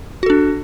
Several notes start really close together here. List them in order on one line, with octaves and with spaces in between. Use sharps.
F#4 A4 D4